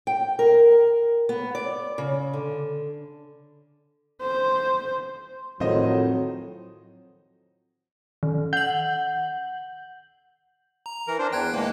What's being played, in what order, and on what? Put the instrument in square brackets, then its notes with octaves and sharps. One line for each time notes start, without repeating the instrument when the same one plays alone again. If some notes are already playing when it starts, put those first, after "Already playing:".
[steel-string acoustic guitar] G5
A#4
B3
D5
C#3
D3
[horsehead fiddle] C5
[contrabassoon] F2 [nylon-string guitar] A2 D#3 [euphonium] F#3 [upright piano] C5 D#5
[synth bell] D#3
[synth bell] F#5 F#7 [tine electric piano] G6
[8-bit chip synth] A#5
[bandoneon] E3 A#4
D4 C5
[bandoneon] E2 [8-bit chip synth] G5 F#6 G#6
[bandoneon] D#3 E3 [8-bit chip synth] G#3 A#3